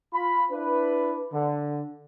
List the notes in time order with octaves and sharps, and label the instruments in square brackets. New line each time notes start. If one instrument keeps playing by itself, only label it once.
[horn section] F4 B5
D4 E4 B4
D3